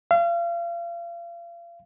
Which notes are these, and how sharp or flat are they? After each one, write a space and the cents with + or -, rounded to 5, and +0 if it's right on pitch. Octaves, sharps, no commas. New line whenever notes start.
F5 -35